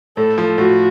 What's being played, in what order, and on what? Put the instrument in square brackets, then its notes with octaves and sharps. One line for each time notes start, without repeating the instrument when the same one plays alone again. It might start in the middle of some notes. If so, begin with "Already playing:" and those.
[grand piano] A2 [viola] A4
[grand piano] F3
[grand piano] A2 [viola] F#4